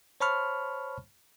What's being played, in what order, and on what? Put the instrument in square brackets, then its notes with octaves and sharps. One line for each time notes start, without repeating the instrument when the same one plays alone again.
[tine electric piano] C5 C#5 A5 B5 C#6 F6